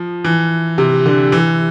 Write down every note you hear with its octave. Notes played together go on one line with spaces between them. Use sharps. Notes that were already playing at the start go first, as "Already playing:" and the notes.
Already playing: F3
E3
C3
D3
E3